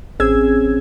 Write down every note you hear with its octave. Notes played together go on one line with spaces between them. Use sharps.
A1 C4 C#4 G#4 E6 G#6